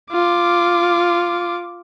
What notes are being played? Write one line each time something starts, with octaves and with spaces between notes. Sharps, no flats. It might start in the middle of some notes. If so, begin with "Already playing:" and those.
F4 D6